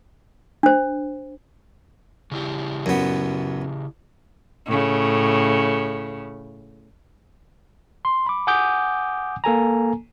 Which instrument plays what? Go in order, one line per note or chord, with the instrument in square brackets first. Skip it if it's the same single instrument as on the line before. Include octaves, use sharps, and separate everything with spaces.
[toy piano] D4 C5
[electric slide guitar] C#3 E4 G4
[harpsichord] F#2 B3
[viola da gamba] A2 C#3
[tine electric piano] C6
B5 D6
F#5 G#5 D6 D#6 G6
A#3 A4 G#5 A#5